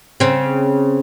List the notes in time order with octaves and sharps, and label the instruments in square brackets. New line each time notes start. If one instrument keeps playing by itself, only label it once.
[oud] C#3 C4